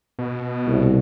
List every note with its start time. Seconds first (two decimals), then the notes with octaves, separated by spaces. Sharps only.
0.19 B2
0.67 C2